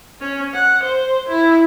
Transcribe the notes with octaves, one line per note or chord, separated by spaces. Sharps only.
C#4
F#5
C5
E4